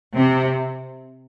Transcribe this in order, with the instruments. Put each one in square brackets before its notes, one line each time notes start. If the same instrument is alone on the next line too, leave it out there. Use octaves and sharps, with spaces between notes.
[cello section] C3